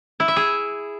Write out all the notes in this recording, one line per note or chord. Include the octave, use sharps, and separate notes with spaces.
E4
E5
G#4